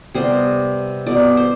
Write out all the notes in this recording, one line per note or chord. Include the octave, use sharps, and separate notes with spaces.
C3 G3 B3 C5
B2 B3 D5
C5